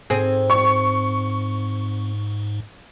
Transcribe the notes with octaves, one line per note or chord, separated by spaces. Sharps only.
G#2 C4 G#4
C#6